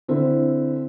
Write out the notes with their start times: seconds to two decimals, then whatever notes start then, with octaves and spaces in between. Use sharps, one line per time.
0.08 D3 C4 E4